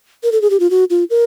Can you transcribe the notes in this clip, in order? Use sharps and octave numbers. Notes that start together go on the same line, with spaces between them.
A#4
A4
G#4
G4
F4
F#4
F4
A#4